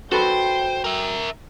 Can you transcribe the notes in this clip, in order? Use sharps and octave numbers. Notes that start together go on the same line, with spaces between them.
F#4 A4 B4 C5 G5
A#4 E5